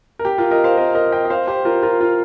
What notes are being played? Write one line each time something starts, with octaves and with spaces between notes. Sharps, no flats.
A#4
G4
F4 A#4
A#4 D#5
C5 F5
A#4 D#5
A#4 D#5
D#5 G5
D#5
C5 F5
G4 C5
F4 A#4
F4 A#4
F4